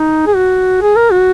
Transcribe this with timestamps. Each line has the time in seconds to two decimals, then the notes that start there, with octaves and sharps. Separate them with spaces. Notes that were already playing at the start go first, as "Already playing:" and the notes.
Already playing: D#4
0.26 G#4
0.36 F#4
0.82 G#4
0.96 A#4
1.12 F#4